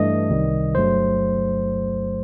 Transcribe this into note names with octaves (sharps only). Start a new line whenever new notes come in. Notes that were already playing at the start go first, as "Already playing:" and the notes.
Already playing: G2 E3 A3 D#5
C2 C3 D#3 G3
G1 G2 F#3 A3 C5